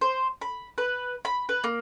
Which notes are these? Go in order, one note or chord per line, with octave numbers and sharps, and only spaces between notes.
C5
B5
B4
B5
B4
A#3